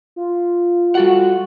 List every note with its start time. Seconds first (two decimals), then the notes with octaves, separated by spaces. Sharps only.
0.16 F4
0.95 G3 F#4 A4 F#5